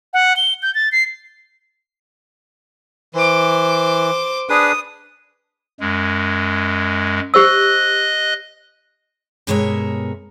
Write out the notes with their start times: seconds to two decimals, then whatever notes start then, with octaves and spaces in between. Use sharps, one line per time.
0.14 F#5
0.37 G7
0.63 G6
0.75 A6
0.92 C7
3.14 E3 C5 D6
4.50 D4 G#4 B4 D#6
5.80 F#2 G#3
7.34 G4 C5 D#5 E6 F#6
9.47 G2 B2 G#3 A#4 C#5 E5